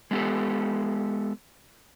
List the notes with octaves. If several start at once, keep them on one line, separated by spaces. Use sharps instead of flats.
G#3 B3 F4 G4 A4